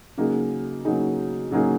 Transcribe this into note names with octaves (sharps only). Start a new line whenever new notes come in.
C#3 F#3 A#3 D#4 G#4
C#3 F#3 A#3 D#4 G#4
C#3 F#3 A#3 D#4 G#4